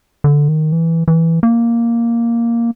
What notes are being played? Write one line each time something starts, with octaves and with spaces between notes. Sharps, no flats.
D3
D#3
E3
E3
A#3